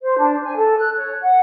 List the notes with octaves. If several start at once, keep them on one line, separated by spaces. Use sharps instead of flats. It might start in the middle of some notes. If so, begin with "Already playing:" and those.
C5
D4
G#5
A4
F#6
C#5
F#5